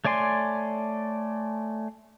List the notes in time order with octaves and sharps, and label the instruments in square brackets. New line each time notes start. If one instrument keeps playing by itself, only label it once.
[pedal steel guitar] A3 C#5 D5 G#5 C6